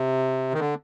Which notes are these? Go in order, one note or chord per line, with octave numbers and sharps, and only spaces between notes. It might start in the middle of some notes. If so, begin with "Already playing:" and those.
Already playing: C3
D#3
D3